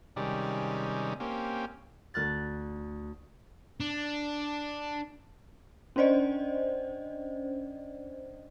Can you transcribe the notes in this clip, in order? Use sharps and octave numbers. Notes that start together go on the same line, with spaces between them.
C3 D#3 G3 G#3 C#4 D5
A#3 C4 C#4 G4
D2 F6 F#6 A6
D4
C#4 D4 C5 D5 D#5